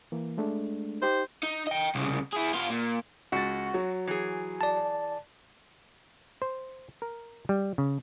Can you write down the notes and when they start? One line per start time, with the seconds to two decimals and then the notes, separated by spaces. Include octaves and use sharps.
0.12 E3 A#3
0.38 G#3 A3 D4
1.02 D#4 G4 C5
1.43 D#4
1.67 D#5 G5
1.95 C2 C#3
2.33 E4 G#4
2.54 B3 F4
2.70 A#2
3.32 C#2 F#4 A6
3.74 F#3 C#5
4.07 E3 G#4
4.61 D5 A5
6.42 C5
7.02 A#4
7.49 G3
7.78 C#3